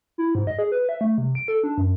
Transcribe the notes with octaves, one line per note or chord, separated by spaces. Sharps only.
E4
G#2
D#5
G#4
B4
E5
A3
C3
D7
A4
D4
F#2